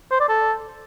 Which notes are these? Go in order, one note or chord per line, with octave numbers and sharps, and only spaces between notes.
C5
D5
A4